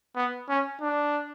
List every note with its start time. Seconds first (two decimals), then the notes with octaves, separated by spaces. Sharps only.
0.16 B3
0.49 C#4
0.82 D4